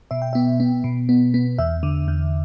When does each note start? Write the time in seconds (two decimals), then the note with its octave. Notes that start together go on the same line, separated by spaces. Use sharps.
0.11 B2 E5
0.22 G5
0.33 B3 E5
0.60 B3
0.84 B2
1.09 B3
1.34 B3
1.58 E2 E5
1.83 D3
2.08 E2